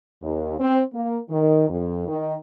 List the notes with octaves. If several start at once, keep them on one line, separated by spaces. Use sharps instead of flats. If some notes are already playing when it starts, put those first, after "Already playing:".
D#2
C4
A#3
D#3
F2
D#3